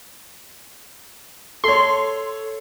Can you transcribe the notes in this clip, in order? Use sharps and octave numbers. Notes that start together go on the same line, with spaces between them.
A4 C#5 C6